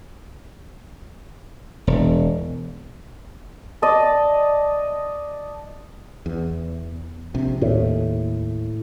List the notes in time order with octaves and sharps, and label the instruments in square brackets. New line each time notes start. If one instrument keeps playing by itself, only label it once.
[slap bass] E1
[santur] D5 D#5 A5
[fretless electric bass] E2
A#1 C3
[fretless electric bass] D#2 [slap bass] A2